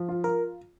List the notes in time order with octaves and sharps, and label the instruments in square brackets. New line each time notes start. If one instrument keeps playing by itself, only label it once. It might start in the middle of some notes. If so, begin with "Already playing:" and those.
Already playing: [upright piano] F3
F4
[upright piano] F4 [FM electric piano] A#4